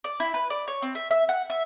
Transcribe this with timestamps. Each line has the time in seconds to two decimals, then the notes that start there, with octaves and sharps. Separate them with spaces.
0.04 D5
0.20 E4
0.34 B4
0.50 D5
0.68 C#5
0.82 C4
0.95 E5
1.11 E5
1.29 F#5
1.50 E5